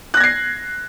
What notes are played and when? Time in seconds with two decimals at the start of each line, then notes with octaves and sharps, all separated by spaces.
0.14 F#6
0.17 A#6
0.20 G#6
0.24 C7